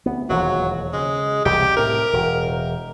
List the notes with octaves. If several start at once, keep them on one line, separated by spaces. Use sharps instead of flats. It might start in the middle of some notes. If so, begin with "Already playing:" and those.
D2 B3
E1 D#2 F3 F#3
C#3 G#3
E1 C2 C3 G4
A2 C3 A#4
E1